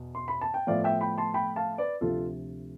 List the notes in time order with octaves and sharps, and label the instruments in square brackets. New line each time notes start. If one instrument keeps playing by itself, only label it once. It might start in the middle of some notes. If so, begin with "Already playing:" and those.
Already playing: [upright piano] E2 B2
C6
B5
A5
G5
A2 F3 B3 D5 F5
E5 G5
G5 B5
A5 C6
G5 B5
F5 A5
B4 D5
D2 C3 F3 F4 A4